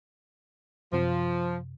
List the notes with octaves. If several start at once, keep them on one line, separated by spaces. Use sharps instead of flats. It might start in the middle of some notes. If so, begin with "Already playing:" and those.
F#2 C3 F3